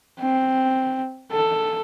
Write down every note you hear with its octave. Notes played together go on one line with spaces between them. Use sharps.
C4
A4